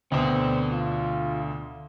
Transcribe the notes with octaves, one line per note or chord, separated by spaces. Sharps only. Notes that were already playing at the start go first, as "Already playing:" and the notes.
D2 B2 D3 C4 D4
F4